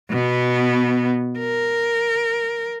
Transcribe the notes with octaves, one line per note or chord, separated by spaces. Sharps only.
B2 B3
A#4